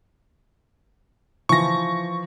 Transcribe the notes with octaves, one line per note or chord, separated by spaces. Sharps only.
E3 F3 C#6 A#6